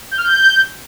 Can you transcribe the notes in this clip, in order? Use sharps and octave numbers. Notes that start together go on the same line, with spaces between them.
G6
F6
G6